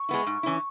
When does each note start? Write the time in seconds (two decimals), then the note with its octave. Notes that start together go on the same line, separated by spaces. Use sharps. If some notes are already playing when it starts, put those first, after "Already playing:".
Already playing: C#6
0.09 G#3 B3 E4
0.27 G#2
0.43 E3 C#4 E4